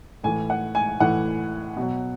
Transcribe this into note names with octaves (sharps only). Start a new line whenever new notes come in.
A2 E3 G#5
F#5
G#5
A2 E3 F#5
B2 F#3